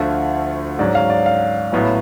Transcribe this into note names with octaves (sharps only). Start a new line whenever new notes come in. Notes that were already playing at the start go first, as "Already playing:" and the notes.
Already playing: D2 D3 F3 A3 F4
G#2 F#3 C#4 D5
F5
D5
F5
A1 A2 F#3 B3